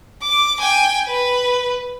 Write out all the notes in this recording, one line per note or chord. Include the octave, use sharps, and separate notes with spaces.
D6
G5 G#5
B4